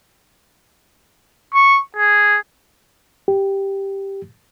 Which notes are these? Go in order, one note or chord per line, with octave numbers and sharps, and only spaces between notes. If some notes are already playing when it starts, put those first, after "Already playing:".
C#6
G#4
G4